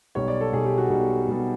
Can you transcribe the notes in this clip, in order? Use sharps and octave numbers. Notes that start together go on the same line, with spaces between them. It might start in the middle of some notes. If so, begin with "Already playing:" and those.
B1 B2 G3 C#5
D5
A4
B1 B2 G3 G#4
G4
F#4
B1 B2 G3
B1 B2 G3